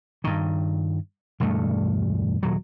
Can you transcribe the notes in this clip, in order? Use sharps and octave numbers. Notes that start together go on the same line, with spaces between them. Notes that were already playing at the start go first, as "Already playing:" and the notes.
G2 D#3
E1 D2 G2 A3
D#1 F#3